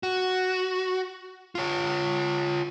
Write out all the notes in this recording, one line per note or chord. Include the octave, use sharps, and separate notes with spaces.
F#4
F4 C#5